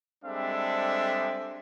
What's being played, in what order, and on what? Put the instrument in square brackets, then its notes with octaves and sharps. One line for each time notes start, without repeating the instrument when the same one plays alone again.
[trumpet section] G3 G#3 C4 D4 A4 E5